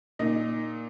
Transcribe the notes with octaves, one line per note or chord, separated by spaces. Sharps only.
A#2 D#4 D#5